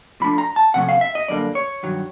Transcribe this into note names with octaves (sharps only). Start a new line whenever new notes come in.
A#2 F3 A3 D4 B5
A#5
A5
C3 F3 A3 C#4 F#5
F5
E5
D#5
F#2 D3 G3 A#3 D5
C#5
G2 D#3 F#3